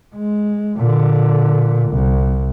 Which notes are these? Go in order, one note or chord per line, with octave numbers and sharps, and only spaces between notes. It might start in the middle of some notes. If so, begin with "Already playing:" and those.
G#3
A#2 D3
C2